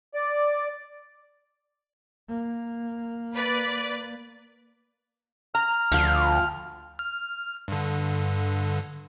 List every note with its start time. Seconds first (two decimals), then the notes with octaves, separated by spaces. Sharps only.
0.14 D5
2.29 A#3
3.34 B4 D5
5.55 A#5 F6
5.92 D2 F3 F4
6.99 F6
7.68 G2 D3